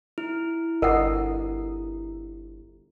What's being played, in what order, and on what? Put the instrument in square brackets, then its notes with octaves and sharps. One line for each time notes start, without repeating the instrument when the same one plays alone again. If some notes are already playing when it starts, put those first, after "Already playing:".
[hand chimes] E4
[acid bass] G1 [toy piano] A#4 F#5 [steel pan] D#5